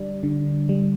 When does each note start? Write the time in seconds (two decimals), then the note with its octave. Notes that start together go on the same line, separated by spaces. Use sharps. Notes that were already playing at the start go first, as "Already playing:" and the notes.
Already playing: D3 G3 D5
0.23 D3
0.69 G3